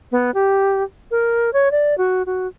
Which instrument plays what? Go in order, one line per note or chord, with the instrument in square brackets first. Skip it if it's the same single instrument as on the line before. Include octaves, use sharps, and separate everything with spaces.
[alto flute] B3
G4
A#4
C#5
D5
F#4
F#4